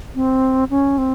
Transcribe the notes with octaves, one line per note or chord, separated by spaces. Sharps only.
C4
C#4
C4